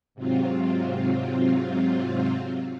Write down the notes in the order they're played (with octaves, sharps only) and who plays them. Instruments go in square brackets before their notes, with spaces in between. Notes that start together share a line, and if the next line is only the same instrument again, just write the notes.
[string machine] G#2 C3 F#3 C4 F4